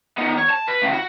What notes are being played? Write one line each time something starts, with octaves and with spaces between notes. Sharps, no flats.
D#3 B3
C#5
A5
B4
A2 C#3
F#4